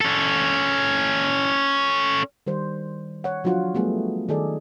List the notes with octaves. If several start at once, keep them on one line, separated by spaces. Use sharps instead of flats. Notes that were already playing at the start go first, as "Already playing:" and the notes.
C#4 A4
D#3 G3 C5
C#5 F#5
F3 F#3 D4 F4 F#4 F#5
G3 A3 B3 G#4
D#3 D#4 G#4 A4 D5